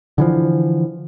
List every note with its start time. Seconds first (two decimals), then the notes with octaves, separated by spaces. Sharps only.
0.18 D3 E3 F3